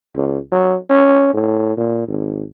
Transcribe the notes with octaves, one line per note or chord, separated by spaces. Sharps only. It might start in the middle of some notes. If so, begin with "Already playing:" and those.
C#2
F#3
C#4
A2
A#2
G#1